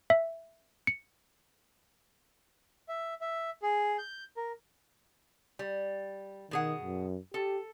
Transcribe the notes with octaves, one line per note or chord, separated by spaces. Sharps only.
E5
C#7
E5
E5
G#4
G6
A#4
G3
B2 D#3 G#4 F#5
F#2
G4 A4